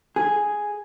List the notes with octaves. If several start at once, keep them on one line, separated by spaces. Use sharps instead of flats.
G#4